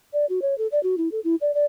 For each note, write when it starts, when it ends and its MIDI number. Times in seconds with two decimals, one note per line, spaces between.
0.13 0.26 74
0.29 0.40 66
0.42 0.57 73
0.58 0.67 69
0.72 0.82 74
0.83 0.96 66
0.98 1.09 64
1.12 1.20 69
1.24 1.35 64
1.41 1.54 74
1.54 1.65 74